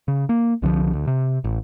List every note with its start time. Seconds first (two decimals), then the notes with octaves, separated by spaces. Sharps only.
0.08 C#3
0.29 A#3
0.62 C2 D3 D#3 F3
0.93 D2
1.07 C3
1.44 A1